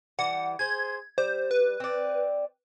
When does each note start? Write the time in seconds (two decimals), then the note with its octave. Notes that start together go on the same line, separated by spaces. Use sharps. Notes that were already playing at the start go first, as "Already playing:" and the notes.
0.19 E3 G3 F#5
0.59 G#4 C5 G#6
1.18 G3 C5
1.51 B4
1.80 C4 D5